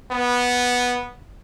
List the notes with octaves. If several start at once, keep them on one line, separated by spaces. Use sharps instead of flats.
B3